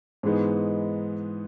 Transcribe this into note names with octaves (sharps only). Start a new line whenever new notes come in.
G#2 E3 G#3 B3 D#4